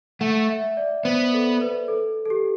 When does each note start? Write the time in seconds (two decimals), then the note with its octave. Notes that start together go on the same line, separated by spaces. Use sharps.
0.20 A3 F#5
0.49 E5
0.77 D5
1.04 B3 C5
1.33 A4
1.61 B4
1.88 A4
2.25 A4
2.30 G4